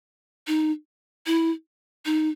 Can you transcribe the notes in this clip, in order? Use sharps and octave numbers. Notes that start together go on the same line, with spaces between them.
D#4
E4
D#4